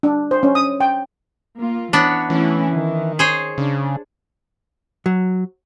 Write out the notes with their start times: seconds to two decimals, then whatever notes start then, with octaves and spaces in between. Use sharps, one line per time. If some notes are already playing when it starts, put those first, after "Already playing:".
0.03 D4
0.31 C5
0.43 C#4
0.55 D#6
0.81 G5
1.58 A#3 F4
1.93 E3 B3 D4 C#5
2.30 E3 A3 C#4 E4
2.71 D#3
3.19 G#4 C5 C#5
3.58 C#3 D4
5.06 F#3